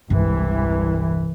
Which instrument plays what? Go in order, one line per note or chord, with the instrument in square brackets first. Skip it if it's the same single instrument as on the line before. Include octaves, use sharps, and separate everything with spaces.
[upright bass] E1 G2 [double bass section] C2 E3